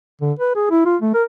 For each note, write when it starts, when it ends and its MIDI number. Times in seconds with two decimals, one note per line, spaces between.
0.21 0.32 50
0.39 0.53 71
0.56 0.70 68
0.71 0.83 64
0.85 0.96 65
1.02 1.12 57
1.14 1.23 70